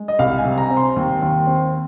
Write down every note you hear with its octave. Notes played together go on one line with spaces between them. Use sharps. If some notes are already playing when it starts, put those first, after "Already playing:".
Already playing: G#3
D#5
C2 F5
G#5
C3
A#5
C4
C6
D#2
D#2
C4